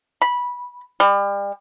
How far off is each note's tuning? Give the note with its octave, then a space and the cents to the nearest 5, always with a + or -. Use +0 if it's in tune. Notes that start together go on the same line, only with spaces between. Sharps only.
B5 -15
G3 +35